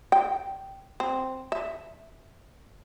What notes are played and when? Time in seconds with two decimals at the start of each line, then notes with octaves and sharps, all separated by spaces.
0.12 G5
1.00 C4
1.52 E5